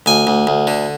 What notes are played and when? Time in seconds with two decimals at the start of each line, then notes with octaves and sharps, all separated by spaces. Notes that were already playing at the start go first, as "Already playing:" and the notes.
0.06 D2 G#5
0.27 D2
0.47 D2
0.67 D3